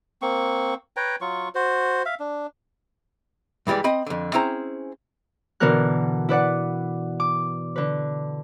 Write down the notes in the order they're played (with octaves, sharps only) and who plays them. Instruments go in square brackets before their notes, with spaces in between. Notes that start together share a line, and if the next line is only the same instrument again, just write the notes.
[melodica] A#3 C4 C#6
B4 C#5 G5 A#5
F#3 F4 C#6
F#4 C5
E5 F5
D4
[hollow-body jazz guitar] G2 E3 G3 G#3 D5
C4 D#5 B5
F2 D3
C4 C#4 E4 G#4 C5 A#5
[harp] B2 D3 E3 B3 A#4 F#6
E4 B4 D5 F#5
D6
D3 B4